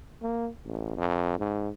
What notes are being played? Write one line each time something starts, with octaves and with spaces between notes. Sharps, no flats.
A#3
A1
F2
G#2